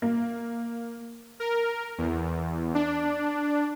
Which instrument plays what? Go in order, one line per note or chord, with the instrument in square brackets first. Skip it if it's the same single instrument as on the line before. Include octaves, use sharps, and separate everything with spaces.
[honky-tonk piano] A#3
[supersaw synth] A#4
E2
D4